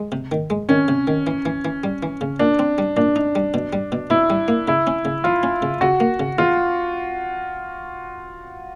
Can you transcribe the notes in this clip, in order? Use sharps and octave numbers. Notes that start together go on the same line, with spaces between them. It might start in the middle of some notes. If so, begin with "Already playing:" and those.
Already playing: G#3
C3
D#3
G#3
D#3 C#4
C3
D#3
E3
E3
E3
G3
E3
C#3
A#2 D4
C4
G3
A#2 D4
D#4
G3
B2
G3
B2
B2 E4
G3
A#3
C#3 E4
C#4
C#3
F3 F4
C#4
C#3
C#3 F#4
A#3
C#3
E2 F4